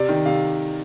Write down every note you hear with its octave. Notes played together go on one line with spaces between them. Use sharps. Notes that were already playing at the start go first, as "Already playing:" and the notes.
Already playing: C3 D5
D#3
C3 F5